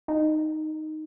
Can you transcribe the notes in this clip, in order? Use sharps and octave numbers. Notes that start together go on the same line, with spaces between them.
D#4